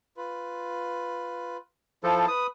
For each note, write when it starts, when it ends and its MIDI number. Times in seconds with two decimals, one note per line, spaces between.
0.17 1.57 65
0.17 1.57 71
2.04 2.26 53
2.04 2.28 64
2.04 2.26 69
2.04 2.28 72
2.04 2.28 81
2.28 2.47 71
2.28 2.47 87